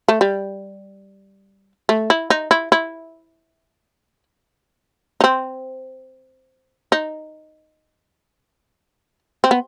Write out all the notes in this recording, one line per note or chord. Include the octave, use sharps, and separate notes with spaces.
A3
G3
A3
E4
D#4
E4
E4
D#4
C4
D#4
C4
B3